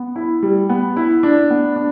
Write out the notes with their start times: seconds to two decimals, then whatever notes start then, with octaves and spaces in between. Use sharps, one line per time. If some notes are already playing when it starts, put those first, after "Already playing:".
Already playing: B3
0.16 E4
0.43 G3
0.69 B3
0.97 E4
1.23 D4
1.50 B3
1.76 D4